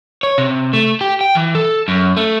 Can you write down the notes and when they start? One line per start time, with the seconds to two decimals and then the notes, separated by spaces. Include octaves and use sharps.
0.23 C#5
0.38 C3
0.73 A3
1.01 G4
1.21 G5
1.35 E3
1.55 A4
1.88 F#2
2.17 A3